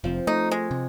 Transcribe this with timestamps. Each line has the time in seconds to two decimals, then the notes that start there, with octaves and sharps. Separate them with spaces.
0.04 F1 F3 C4
0.27 A3 D#4
0.51 G#3
0.71 C3